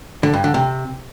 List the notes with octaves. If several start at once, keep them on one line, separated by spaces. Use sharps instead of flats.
D3
G2
D3
C3